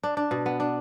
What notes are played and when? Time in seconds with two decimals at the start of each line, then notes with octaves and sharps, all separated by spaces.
0.03 D4
0.17 D4
0.31 B2
0.46 B3
0.60 D4